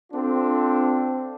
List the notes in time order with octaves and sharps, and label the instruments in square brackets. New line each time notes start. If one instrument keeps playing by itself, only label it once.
[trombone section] C4 D4 F4 A4